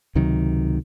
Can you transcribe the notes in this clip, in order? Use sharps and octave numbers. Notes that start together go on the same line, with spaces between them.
C#2 C3 D#3 F#3